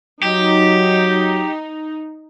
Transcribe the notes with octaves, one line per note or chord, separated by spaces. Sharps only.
F#3 D#4 G4